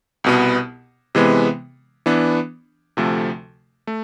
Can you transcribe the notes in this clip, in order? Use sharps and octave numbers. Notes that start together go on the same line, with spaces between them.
C2 B2 B3
C3 E3 G#3 B3
E3 B3 D4
D2 C3 F3 A3
A3